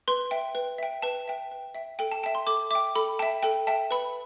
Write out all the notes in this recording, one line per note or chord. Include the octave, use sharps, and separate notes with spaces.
B4 C6
E5 G5
B4
E5 G5
B4 A5
E5 G5
B4
E5 G5
A4 G5
A5
E5 G5 A5
C6
A4 D6
E5 G5 D6
A4 B5
E5 G5 A5
A4 G5
E5 G5 A5
B4 B5